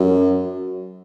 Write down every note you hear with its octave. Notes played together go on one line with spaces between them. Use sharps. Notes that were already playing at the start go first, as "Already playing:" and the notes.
Already playing: F#2